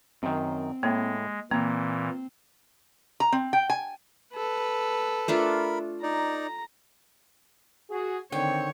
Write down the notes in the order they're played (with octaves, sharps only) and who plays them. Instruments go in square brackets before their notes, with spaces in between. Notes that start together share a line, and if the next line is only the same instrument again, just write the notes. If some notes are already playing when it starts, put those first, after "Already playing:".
[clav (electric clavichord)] F#2 D#3 [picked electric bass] C4
[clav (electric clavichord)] A2 [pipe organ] G#3 [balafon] A#3
[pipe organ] A#2 E3 [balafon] A#3 [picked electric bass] C4 [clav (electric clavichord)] A#5
[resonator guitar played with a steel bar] A#5
C4
G5
G#5
[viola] A4 B4
[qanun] A3 D4 F4 [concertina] A#4 B5
[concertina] D#4 D5 [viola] A#5
[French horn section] F#4 G#4
[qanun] D3 D#3 [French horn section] C4 [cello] C#5 [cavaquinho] G5